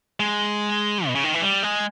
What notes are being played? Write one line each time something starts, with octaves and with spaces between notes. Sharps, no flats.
G#3
B2
C#3
D#3
E3
G3
G#3